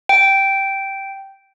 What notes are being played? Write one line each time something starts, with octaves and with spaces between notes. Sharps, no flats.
G5